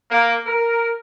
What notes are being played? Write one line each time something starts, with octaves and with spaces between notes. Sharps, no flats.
A#3
A#4